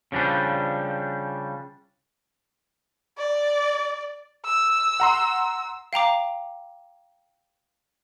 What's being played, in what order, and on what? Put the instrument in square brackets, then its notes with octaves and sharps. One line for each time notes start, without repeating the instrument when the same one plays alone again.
[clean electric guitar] C#3 F3 G3 D4
[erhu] D5
E6
[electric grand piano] F#5 A#5 C6
[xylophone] F5 G5 A#5 D6